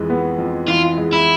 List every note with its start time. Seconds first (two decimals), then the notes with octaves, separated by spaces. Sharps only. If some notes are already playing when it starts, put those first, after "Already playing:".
Already playing: F2 E3 G#3
0.10 B3
0.39 F2
0.68 E3 F4
0.98 G#3
1.13 E4